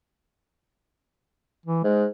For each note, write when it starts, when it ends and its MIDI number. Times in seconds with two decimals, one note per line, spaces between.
1.66 1.83 52
1.84 2.06 44
1.84 2.06 56